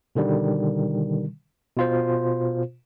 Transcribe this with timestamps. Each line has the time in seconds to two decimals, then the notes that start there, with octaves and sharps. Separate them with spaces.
0.15 B2 D3 D#3 G3
1.77 B2 F4 C5